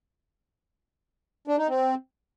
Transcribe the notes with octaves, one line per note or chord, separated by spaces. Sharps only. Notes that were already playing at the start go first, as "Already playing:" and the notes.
D4
D#4
C4